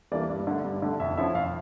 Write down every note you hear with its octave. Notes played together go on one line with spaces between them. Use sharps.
E3 G3 A#3 D4 D5
G2
D3 A3
G2
D3 A3
F2 E5
D3 F3 C#4 E4 E5
F2 F5